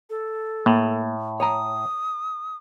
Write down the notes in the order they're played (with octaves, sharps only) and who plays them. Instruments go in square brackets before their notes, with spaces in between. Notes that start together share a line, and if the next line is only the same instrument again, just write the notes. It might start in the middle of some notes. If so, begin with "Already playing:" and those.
[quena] A4
[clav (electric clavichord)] A2 [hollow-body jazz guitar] A#3
[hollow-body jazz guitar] C#5 G#5 A#5 [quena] D#6